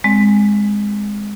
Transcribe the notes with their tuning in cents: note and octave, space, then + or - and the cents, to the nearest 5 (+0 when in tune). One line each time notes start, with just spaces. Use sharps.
G#3 -10 C4 +0